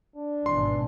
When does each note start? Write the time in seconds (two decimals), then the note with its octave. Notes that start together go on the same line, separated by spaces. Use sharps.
0.16 D4
0.46 G#1 B2 E3 C6